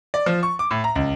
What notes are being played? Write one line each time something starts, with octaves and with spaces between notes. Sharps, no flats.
D5
F3
C#6
D6
A2
A#5
C#2